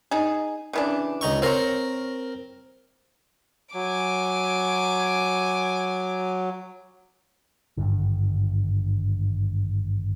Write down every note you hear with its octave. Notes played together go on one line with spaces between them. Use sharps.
D#4 G#4
C#3 E3 D4
C#2 D#4 C#6
C4 F4 A#4 C#5
F#3 G#5 D6
G#1 G2 D3